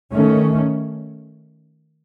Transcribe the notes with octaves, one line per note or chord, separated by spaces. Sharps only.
D#3 A3 C#4